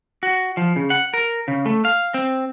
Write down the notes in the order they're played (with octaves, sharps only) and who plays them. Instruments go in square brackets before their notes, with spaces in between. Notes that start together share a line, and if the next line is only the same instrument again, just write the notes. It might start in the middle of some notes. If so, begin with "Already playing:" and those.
[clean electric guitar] F#4
F3
C#3
F#5
A#4
C#3
A3
F5
C4